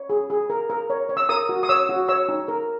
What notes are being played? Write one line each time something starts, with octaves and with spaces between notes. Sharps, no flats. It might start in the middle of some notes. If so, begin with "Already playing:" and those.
Already playing: C#5
G#4
G#4
A#4
A#4
C#5
C#5
E6
A#4 D#6
F#4
D#6
C#5 E6
F#4
C#5 E6
D#4
A#4